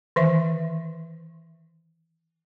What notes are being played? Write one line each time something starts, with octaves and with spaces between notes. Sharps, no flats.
D#3 E3 E5